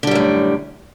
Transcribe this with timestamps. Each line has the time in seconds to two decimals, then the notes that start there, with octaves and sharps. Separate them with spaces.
0.03 D3
0.07 G3
0.11 F#2
0.15 A2